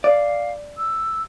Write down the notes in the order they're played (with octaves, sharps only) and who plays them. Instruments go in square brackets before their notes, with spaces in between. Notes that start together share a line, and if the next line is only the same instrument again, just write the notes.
[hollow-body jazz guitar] D5 [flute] F5
[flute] E6